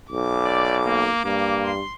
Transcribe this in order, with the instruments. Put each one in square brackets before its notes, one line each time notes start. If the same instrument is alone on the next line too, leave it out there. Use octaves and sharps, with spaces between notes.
[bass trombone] B1 [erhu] D6
[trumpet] D5
A#3
[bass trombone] G2 [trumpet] A#3
[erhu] C6